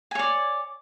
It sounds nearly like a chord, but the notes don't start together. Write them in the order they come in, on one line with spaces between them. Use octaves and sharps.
G#5 C#5 D5